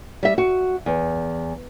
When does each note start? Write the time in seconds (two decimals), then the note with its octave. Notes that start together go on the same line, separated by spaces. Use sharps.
0.23 G3 E5
0.38 F#4
0.86 E2